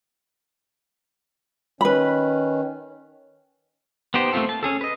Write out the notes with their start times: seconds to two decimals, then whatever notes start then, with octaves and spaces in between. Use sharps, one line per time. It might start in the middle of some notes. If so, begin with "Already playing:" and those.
1.81 D#3 C#4 B4 B5
4.14 B3 D#4 G4 C5
4.33 A3 A#3 C4 F4 A4
4.49 A5
4.63 C#4 G#4 A4
4.81 B4 D#5